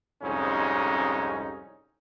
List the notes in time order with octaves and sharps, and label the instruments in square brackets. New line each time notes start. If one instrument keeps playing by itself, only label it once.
[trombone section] C2 F2 G#2 C#4 D#4